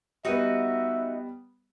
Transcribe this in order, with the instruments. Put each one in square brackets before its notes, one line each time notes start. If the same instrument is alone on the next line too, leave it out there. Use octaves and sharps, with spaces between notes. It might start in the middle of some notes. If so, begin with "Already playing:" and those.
[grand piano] G3 B3 [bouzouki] D#4 F#4 D#5 [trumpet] E5